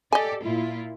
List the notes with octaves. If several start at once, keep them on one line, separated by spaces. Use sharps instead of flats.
G4 A4 D5 D#5 G#5
A#2 E4 F4